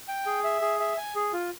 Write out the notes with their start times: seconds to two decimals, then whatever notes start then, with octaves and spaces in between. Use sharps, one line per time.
0.08 G5
0.26 G#4
0.44 E5
0.61 G#4
0.80 E5
0.97 G#5
1.15 G#4
1.33 F4